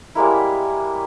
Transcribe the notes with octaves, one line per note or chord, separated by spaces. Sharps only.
G3 G#3 A#3 E4